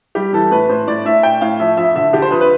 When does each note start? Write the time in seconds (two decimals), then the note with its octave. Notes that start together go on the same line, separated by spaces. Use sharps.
0.15 G3 G4
0.33 E3 A4
0.51 A2 B4
0.69 A2 C5
0.87 A2 D5
1.05 A2 E5
1.23 A2 G5
1.41 A2 F5
1.60 F3 E5
1.77 F2 E5
1.96 D3 E5
2.13 D3 G4
2.22 C5
2.31 F2 B4
2.41 B4